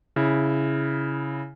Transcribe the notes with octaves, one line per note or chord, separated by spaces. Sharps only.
C#3 E4